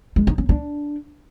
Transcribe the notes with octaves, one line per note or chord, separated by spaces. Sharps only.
G#3
D#4
C#4
D4